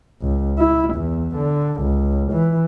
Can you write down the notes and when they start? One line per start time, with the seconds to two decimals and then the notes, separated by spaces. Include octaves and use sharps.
0.22 C#2
0.58 E4
0.94 E2
1.36 D3
1.82 C#2
2.32 E3